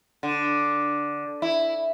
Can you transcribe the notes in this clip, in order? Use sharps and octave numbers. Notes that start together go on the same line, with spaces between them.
D3
E4